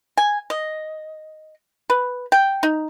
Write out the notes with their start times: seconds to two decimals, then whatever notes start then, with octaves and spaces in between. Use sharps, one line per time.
0.18 G#5
0.50 D#5
1.90 B4
2.32 G5
2.63 D#4